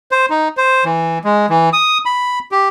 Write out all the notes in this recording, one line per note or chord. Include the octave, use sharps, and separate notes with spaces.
C5
D#4
C5
E3
G#3
E3
D#6
B5
G4